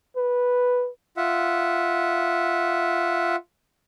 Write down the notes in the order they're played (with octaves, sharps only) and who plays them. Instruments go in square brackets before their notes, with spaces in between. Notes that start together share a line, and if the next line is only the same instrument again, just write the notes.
[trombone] B4
[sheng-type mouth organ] F4 E5 F#5